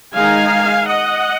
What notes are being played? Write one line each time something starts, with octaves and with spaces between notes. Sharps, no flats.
D#3 G#3 D#4 F5 G#5
D#5 F#5